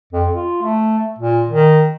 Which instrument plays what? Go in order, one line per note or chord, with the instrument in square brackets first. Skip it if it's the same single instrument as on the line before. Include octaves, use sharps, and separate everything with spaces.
[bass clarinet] F2
F4
A3
A#2
D#3